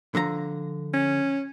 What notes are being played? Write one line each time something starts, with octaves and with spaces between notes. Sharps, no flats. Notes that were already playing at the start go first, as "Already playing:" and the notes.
D3 F3 A#5
C#4